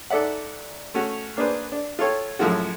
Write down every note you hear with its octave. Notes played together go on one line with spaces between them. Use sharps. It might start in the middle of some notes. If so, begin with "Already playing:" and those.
G#2 A4 D5 E5 F#5
A3 C#4 F#4
A#3 D4 G#4 B4 C5
D4
F4 A4 C#5 G5
F#2 A2 F3 G#3 F4 F#4